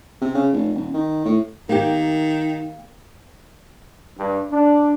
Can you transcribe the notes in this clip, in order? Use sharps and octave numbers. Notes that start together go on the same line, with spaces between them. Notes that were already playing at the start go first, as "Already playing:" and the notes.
C3
C#3
F1
D#1
D#3
A2
D#3 A#3 G4
G2
D4